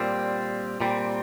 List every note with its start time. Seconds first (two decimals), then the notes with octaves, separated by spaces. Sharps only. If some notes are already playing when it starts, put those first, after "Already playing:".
Already playing: A#2 G3 C4
0.81 A#2 G3 C4